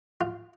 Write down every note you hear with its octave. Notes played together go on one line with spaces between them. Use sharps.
F4